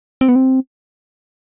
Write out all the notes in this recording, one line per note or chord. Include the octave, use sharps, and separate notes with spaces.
C4
B3
C4